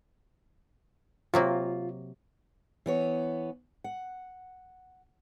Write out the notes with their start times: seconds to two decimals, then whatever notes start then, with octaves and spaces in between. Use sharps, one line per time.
1.34 C3 F#3 A#3 F4
2.86 E3 B3 C#5
3.84 F#5